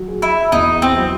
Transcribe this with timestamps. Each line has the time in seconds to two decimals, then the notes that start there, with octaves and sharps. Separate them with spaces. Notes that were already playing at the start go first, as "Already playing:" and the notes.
Already playing: F#3
0.08 G#4
0.22 E4
0.52 E2 D#4
0.82 C4
0.97 F#3